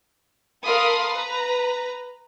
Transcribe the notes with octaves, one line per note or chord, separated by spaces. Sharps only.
A4 A#4 F5 B5 C6 D#6
B4 A#5